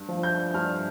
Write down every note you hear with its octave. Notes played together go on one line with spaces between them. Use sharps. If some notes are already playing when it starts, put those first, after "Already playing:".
Already playing: G2
F3
G6
G2 F6